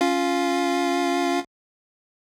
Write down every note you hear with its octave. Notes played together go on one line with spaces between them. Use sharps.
C#4 F4 F5